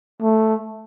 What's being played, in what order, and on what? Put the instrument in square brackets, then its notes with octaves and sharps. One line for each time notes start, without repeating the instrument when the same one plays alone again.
[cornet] A3